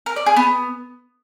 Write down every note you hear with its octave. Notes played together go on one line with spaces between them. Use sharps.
A#4
D5
G#4
B3